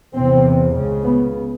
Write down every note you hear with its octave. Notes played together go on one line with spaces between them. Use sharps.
E2 C3 C4
C#2 C#3
B3